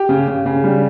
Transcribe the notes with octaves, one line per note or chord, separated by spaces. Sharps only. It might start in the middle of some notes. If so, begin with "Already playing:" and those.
Already playing: G4
C#3
C#3
C#3
G3